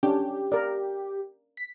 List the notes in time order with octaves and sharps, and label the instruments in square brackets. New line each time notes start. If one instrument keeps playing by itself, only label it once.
[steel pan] C#4 D4 [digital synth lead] G4
[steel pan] A#4 D5
[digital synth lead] B6